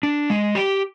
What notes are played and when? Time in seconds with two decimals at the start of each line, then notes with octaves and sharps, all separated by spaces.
0.03 D4
0.30 G#3
0.55 G4